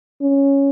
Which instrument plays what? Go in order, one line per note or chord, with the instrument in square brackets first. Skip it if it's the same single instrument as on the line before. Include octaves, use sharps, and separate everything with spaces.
[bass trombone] C#4